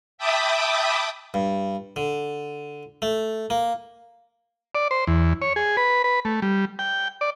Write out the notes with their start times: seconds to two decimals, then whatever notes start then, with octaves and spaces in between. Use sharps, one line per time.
0.18 E5 G5 A5 B5 D6 D#6
1.34 G2
1.96 D3
3.02 A3
3.50 A#3
4.75 D5
4.91 C5
5.07 E2
5.42 C#5
5.56 G#4
5.77 B4
6.04 B4
6.25 A3
6.42 G3
6.79 G5
7.21 D5